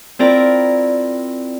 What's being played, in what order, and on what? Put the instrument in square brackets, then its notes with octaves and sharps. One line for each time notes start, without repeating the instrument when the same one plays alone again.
[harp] C4 E4 F4 A#4 D5 A#5